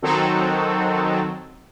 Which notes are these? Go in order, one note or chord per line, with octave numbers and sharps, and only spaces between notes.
D#3 F#3 C4 D#4 F#4 A4